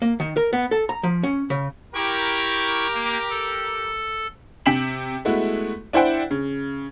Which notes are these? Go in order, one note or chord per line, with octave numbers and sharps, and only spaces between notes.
A#3
D#3
A#4
B3
A4
A#5
F3
C#4
C#3
E4 G4 A#4 G5 C#6
A#3
A4
C3 G5 B6 E7 F#7
G#3 A3 B3 E4 F#4
D4 E4 C5 F#5 G5
C#3